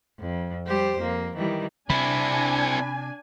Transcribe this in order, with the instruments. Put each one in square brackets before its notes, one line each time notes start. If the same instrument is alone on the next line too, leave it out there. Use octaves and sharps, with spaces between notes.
[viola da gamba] F2
G3 G4 C5
F2 A#3
D#3 E3 G3
[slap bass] C3 [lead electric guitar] C4 E4 [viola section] D4 G#5 [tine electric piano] B5